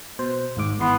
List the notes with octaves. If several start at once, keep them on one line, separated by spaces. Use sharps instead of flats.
B2 C5
G#1 G#2 D6
G#1 E3 B3 C6